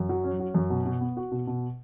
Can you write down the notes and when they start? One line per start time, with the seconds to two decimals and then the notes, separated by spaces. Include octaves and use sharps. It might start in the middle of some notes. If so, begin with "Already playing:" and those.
Already playing: F#2
0.09 F#3
0.24 C#4
0.40 F#4
0.55 F#2
0.70 B2
0.86 B2
1.01 B3
1.17 F#4
1.32 B2
1.47 B2